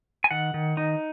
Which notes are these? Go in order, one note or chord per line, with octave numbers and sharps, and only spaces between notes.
G#5
D#3 F#5
D#3
D#4